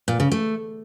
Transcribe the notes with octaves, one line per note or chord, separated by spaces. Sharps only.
A#2
C#3
A3